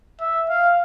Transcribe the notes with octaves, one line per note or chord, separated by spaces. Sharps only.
E5
F5